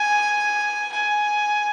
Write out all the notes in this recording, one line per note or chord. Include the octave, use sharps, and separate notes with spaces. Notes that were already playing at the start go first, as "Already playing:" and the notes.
Already playing: G#5
G#5